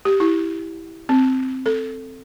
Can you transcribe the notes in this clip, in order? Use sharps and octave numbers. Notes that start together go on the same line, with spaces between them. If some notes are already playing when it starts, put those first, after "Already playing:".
G4
E4
C4
A4